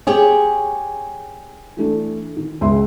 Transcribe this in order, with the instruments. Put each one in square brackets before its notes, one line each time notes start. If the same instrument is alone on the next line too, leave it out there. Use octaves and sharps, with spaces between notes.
[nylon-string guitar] G4 G#4 C#5
[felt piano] E3 A3 D4
D#3
C#2 E5 C6